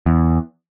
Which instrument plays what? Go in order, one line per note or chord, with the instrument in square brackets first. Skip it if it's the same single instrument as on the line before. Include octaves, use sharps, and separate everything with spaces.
[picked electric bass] E2